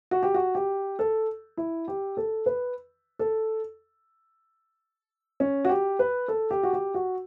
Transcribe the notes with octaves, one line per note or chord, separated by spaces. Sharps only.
F#4
G4
F#4
G4
A4
E4
G4
A4
B4
A4
C#4
F#4
G4
B4
A4
G4
F#4
G4
F#4